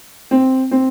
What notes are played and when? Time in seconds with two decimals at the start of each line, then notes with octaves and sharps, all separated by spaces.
0.31 C4
0.71 C4